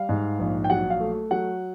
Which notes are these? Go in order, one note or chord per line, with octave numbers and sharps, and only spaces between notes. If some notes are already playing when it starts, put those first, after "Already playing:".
Already playing: G3 F5
G#2
A#1
G5
F#3 F#5
F5
A3
F#3 F#5